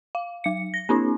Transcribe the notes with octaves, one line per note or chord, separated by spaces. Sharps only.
F5
F#3 C#7
A#6
A#3 C4 D4 E4